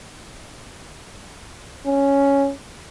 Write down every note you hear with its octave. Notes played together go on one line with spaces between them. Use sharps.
C#4